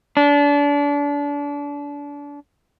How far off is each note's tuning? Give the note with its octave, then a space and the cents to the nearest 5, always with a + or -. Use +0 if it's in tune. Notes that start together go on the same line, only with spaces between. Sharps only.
D4 -30